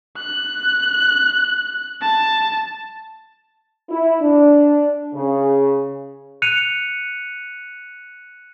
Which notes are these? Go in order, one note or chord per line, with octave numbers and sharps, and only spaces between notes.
F#6
A5
E4
D4
C#3
F#6 C#7 D#7 F7